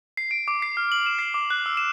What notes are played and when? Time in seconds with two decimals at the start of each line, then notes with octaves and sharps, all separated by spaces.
0.17 C7
0.31 D7
0.48 D6
0.62 C7
0.77 F6
0.92 F#7
1.06 E7
1.19 C7
1.34 D6
1.50 F#6
1.66 E6
1.77 E7